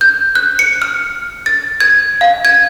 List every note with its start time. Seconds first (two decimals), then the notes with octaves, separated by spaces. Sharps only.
0.01 G6
0.35 F#6
0.59 C#7
0.82 F6
1.46 A6
1.80 G#6
2.21 F5
2.45 G#6